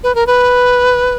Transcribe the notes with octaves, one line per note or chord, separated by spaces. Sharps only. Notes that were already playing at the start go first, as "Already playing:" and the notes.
B4
A#4
B4